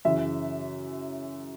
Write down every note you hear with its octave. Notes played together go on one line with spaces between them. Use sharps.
F#2 C#3 E3 E5